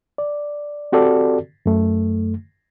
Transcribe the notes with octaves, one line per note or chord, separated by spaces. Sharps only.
D5
C4 F#4 G4 A4 D5
F#2 A3